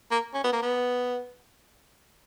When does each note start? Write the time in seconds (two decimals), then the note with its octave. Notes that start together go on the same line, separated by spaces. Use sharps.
0.11 A#3
0.34 C#4
0.44 B3
0.53 A#3
0.62 B3